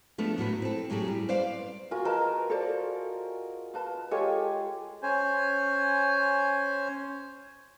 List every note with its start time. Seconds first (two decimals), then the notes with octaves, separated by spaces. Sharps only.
0.18 F3 A3 B3 D4
0.38 A2 F#3 F#4 B4
0.62 C4 A4
0.90 A2 F#3 A3 G4 G#4
1.08 G3
1.29 B4 C5 D5 F5
1.91 F4 F#4 A#4 G#5
2.05 G#4 A#4 B4 D#5 A5
2.50 A4 C5 D5
3.74 F4 B4 A5
4.11 G#3 F4 G4 A4 C#5 G#5
5.03 C#4 C5 G#5